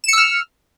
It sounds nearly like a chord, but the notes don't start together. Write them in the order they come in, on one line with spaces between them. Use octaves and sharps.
E7 C#7 E6 F6